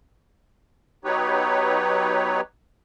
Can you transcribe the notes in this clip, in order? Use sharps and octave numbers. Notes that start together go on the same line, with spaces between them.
F#3 B3 D#4 G4 B4 C#5